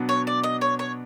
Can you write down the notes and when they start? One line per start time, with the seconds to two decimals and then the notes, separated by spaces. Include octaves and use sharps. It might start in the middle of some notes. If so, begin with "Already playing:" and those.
Already playing: B2 F#3 B3 D4
0.09 C#5
0.27 D5
0.43 D#5
0.61 C#5
0.79 C#5